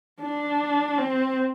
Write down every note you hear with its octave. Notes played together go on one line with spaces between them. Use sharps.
D4
C4